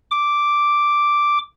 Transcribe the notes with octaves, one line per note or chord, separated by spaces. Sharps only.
D6